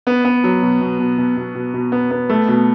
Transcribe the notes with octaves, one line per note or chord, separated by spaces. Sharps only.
B3
B3
F#3
B2
B2
B2
B2
B2
B2
B2
B3
B3
A3
B2